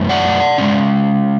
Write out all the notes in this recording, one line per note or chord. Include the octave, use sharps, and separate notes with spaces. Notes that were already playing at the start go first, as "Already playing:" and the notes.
Already playing: F#2 E3 A3
D5 F#5
G#3 C#4